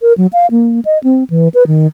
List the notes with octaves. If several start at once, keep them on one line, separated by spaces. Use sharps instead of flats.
A#4
F#3
F5
A#3
D#5
C4
E3
B4
D#3